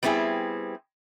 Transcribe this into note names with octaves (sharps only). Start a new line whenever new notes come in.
G3 B3 C4 E4 G#4